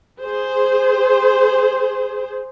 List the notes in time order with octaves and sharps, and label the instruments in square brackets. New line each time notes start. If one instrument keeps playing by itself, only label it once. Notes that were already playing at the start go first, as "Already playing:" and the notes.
[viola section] G#4 C5